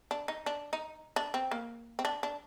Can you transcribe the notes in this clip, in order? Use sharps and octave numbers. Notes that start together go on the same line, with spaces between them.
D4
D#4
D4
D#4
D4
C4
A#3
C4
D4
D4